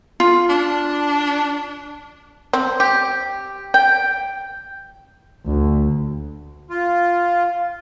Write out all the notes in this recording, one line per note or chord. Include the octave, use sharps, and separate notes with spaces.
F4
D4
C4
G4
G5
D2
F4